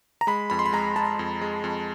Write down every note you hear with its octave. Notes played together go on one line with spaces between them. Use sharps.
A#5
G#3 B5
F2 B5
C6
B5
G#3 A#5
G#3 A5
F2
G#3
F2